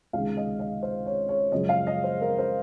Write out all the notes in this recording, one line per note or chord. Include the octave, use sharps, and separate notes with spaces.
C#2 C3 D#3 G#3 F5
D#5
D#5
C5
C#5
C#5
F#2 C#3 F3 G#3 D#5
F5
D#5
C5
A#4
C5